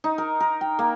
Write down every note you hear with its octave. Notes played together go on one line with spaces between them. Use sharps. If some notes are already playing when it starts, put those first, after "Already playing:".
D#4
A#4
A#4
G5
A#3